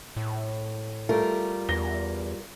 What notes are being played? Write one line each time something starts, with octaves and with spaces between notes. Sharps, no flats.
A2
G3 A3 F4 A#4
E2 A#6 G7